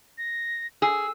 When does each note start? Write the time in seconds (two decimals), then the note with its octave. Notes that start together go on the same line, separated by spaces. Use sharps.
0.18 A#6
0.82 G#4 E6